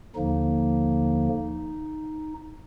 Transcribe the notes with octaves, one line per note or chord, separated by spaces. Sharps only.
D#2 D3 F3 A#3 D#4